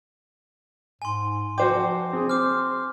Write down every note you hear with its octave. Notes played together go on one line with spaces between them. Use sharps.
G#2 G#5 C6
F3 F#4 C5 G5 D6
C4 G#4
C5 D6 F6